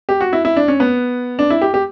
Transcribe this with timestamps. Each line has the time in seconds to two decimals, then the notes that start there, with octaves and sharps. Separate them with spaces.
0.09 G4
0.21 F#4
0.33 E4
0.45 E4
0.56 D4
0.68 C#4
0.80 B3
1.39 D4
1.50 E4
1.62 G4
1.74 G4